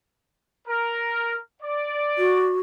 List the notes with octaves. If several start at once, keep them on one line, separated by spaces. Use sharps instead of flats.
A#4
D5
F#4